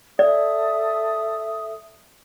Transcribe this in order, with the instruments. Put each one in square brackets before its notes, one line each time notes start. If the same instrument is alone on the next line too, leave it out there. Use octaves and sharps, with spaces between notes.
[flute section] A4 E5 D#6 [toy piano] D5